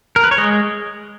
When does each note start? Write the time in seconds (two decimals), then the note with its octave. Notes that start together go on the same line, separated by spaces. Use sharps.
0.16 A#4
0.24 B4
0.31 C#5
0.38 G#3 D#5